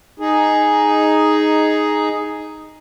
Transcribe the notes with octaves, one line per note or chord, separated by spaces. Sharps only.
D#4 G#4